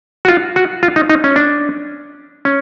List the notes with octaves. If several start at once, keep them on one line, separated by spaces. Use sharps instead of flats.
F#4
F4
F#4
F4
D#4
D#4
C#4
D4
C#4